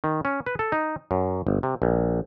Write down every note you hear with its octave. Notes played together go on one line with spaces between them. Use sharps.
D#3
C#4
B4
A4
D#4
F#2
G1
C3
A#1